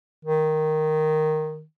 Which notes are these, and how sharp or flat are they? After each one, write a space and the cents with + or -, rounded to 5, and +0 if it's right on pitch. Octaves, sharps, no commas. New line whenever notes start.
D#3 -5